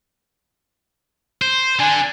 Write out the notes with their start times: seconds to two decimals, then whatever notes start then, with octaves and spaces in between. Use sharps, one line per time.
1.41 C5
1.79 D3 G#5